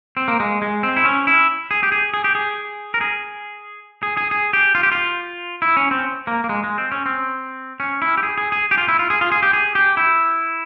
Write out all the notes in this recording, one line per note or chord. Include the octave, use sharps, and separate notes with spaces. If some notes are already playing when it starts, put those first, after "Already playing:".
C4
A#3
G#3
G#3
C4
E4
C#4
E4
G#4
G4
G#4
G#4
G4
G#4
A#4
G#4
G#4
G#4
G#4
G4
F4
G4
F4
E4
C#4
C4
A#3
A#3
G#3
G#3
C4
C#4
C4
C#4
E4
G4
G#4
G#4
G#4
G4
F4
E4
F4
G#4
F4
G#4
G4
G#4
G4
E4